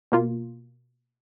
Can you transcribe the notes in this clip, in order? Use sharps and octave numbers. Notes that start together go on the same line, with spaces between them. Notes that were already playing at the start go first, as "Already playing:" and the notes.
B2 A#3 F4